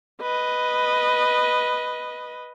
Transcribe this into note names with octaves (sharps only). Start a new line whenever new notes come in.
B4 D#5